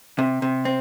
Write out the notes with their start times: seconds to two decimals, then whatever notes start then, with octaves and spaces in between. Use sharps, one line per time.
0.19 C3
0.42 C3
0.65 C4